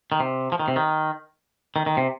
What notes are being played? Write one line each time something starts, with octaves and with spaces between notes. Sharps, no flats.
D#3
C3
F3
D#3
C3
D#3
D#3
D#3
C3